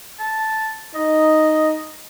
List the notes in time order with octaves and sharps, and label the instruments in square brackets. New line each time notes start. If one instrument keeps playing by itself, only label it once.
[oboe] A5
[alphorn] D#4 [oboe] D#5